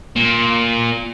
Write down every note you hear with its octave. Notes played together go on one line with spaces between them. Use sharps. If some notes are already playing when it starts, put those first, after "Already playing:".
A#2